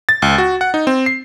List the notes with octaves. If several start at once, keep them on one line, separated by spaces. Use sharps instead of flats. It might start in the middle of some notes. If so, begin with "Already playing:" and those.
A6
C#2
F#4
F#5
D#4
C4
C7